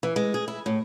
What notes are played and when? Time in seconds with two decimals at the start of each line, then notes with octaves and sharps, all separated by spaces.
0.03 E3
0.16 G#3
0.34 G#4
0.48 E4
0.66 A2